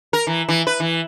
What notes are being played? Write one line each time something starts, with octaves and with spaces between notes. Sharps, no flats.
A#4
E3
E3
B4
E3